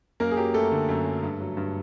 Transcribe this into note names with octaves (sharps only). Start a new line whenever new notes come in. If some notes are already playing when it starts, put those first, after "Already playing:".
F#2 A#3 A#4
G#4
F#3 G4
F#2 A3 A4
D3
F#2
F#3
G2
F#3
G2